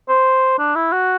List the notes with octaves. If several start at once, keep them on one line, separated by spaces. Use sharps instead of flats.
C5
D4
E4
F#4